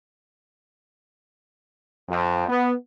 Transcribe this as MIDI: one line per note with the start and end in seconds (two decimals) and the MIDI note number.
2.09 2.48 41
2.49 2.73 59